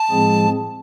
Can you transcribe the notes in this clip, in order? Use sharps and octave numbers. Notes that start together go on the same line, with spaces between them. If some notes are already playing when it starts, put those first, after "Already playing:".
Already playing: A5
A2 F3 G#3 C4 G#4